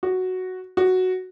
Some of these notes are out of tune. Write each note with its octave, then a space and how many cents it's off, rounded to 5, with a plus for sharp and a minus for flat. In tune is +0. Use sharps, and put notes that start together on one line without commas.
F#4 +0
F#4 +0